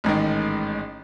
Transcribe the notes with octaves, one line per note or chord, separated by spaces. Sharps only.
A1 G#2 D#3